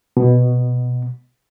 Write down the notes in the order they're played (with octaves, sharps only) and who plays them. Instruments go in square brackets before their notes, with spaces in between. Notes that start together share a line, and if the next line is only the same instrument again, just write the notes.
[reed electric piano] B2